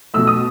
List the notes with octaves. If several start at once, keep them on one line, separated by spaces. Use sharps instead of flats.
B2 A3 E6
D#6